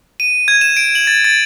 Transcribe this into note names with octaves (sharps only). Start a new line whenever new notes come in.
D#7
G#6
E7
D7
F#7
A6
A6